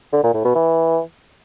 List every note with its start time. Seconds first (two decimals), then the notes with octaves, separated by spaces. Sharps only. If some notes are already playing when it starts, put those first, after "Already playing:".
0.13 D3
0.23 A#2
0.34 A2
0.45 B2
0.55 E3